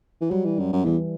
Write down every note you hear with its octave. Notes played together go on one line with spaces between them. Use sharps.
E3
F#3 G3
E3
F#2
F#2
E2 E3